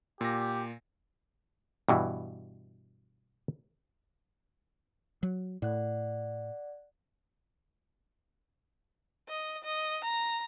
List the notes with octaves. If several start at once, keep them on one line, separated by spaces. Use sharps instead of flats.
A#2 G4 A#6
G2 B2 E3
F#3
A2 D5 F#5 F#6
D#5
D#5
A#5